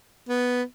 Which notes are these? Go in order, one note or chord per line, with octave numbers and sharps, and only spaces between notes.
B3